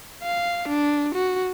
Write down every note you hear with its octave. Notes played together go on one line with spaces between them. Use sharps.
F5
D4
F#4